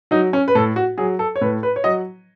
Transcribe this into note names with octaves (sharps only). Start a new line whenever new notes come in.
F#3 D#4
C#4
B4
A2 A4
F#4
F#3 G#4
A4
C#5
A2 B4
B4
C#5
F#3 D#5